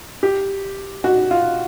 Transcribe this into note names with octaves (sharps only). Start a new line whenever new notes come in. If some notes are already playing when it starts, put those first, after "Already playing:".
G4
F#4
F4